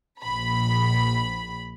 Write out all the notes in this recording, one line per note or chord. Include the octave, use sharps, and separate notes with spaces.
A#1 B5